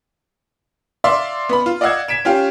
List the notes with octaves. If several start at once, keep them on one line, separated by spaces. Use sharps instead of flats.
D5 E5 F5 C6
B3 B5
F4
D5 D#5 F5 F#5 E6 G#6
G#6 B6 D7 E7
C#4 F4 G4 F5